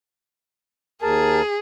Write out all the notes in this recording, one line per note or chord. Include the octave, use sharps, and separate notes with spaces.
D#2 G#4 A#4 A5